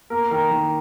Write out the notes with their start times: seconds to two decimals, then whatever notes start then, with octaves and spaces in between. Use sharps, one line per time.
0.10 A#3 A#4
0.31 D#3 A#4
0.51 D#3